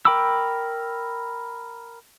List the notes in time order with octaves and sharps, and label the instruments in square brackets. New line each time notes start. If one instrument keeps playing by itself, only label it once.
[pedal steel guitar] A#4 G5 B5 D6 E6